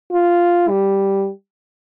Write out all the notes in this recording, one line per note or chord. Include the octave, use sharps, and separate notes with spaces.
F4
G3